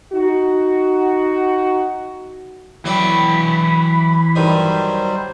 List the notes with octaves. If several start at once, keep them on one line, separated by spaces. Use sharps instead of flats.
D#4 F#4
E3 F#3 D5 G5 B5
G2 D#3 F#3 G3 C5